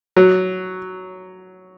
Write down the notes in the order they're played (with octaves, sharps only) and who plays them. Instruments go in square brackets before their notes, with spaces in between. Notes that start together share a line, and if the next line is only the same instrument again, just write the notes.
[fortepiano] F#3